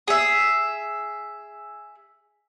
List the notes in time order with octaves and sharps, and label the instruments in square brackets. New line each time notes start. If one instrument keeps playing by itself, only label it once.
[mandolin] G#4 E5